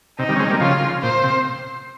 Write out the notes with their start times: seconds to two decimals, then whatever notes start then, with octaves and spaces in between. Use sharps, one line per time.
0.19 C3 D#4
0.29 D#3 G3
0.36 C#4
0.39 G#3 C4
0.50 G3 A#3
0.60 C#3 F3 F4
1.02 A#2 C5
1.24 C3